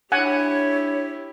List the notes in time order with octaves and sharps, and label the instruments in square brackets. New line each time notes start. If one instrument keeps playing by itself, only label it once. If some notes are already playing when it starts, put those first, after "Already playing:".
[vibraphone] D4 [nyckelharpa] E4 G4 [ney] C#5 [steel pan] F#5 G#5